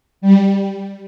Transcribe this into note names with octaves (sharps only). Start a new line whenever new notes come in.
G3